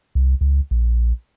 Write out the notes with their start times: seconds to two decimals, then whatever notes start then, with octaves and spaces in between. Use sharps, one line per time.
0.15 C2
0.41 C#2
0.71 A#1